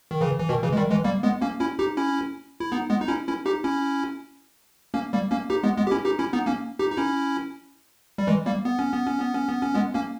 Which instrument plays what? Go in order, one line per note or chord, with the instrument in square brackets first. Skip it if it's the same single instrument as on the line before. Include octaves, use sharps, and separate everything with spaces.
[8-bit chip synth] D#3
C#3 E3
E3
B2 D#3
C#3 E3
G#3
D#3 G3
E3 G#3
G3 A#3
G#3 B3
A#3 C#4
C#4 E4
D#4 G4
C#4 E4
E4
B3 D#4
G#3 B3
D#4
C#4 E4
C#4 E4
D#4 G4
C#4 E4
A#3 C#4
G3 A#3
A#3 C#4
D#4 G4
G#3 B3
G#3 B3
G4
C#4 E4
D#4 G4
C#4 E4
B3 D#4
A#3 C#4
D#4 G4
D#4
C#4 E4
G3
E3 G#3
G3 A#3
B3
C#4
B3
C#4
B3
C#4
B3
C#4
G#3 B3
A#3 C#4